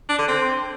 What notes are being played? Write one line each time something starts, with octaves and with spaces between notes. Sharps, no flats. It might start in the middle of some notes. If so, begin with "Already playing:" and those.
D4
D3
C4